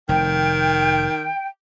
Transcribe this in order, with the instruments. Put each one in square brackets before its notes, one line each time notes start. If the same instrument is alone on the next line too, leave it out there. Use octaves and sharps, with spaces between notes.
[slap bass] F1 [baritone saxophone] D#3 [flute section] G5